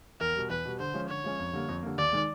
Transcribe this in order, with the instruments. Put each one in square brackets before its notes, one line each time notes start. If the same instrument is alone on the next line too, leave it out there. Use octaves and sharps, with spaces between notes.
[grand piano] E2 [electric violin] A#4
[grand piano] B2 G3
[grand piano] E2 [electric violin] B4
[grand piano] B2 G3
[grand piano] D3 [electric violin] C5
[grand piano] F3 G#3 C#4
[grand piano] D3 [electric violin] C#5
[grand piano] F3 G#3 C#4
F2
D3 G3 A#3
F2
D3 G3 A#3
[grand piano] D#2 [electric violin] D5
[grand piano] D#3 G#3